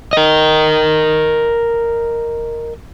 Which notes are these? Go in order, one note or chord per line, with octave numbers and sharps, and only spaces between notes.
A#4 D#5